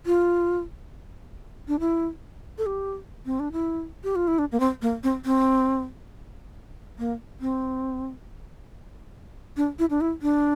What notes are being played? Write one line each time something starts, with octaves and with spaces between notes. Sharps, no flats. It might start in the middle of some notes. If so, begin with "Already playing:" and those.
F4
D4
E4
A4
G4
C4
D4
E4
G4
F4
E4
D4
A#3
C4
A#3
C4
C4
A#3
C4
D4
E4
D4
E4
D4